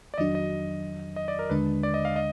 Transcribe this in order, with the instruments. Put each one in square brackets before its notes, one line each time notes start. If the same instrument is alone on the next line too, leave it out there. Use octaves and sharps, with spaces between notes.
[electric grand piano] D5
[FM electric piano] F2 D#3 F#3 D4 F#4 [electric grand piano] D#5
[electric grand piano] D#5
D#5
D5
A#4
[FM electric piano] D#2 D3 G#3 D4 [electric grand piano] B4
[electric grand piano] D5
D#5
F5
D#5